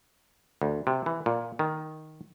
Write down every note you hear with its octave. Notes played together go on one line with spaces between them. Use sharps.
D2
C3
E3
A#2
D#3